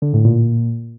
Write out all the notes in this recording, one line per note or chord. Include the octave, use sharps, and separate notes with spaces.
D3
A2
A#2